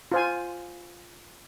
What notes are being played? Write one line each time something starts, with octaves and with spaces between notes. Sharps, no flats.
F4 C5 G#5